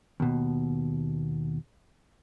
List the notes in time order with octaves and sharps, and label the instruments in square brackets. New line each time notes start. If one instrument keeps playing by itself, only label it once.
[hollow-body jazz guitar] D#2 B2